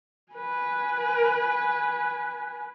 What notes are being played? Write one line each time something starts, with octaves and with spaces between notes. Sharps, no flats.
B4 G#5